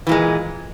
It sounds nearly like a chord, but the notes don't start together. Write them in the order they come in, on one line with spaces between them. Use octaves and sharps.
E3 A#2 G#3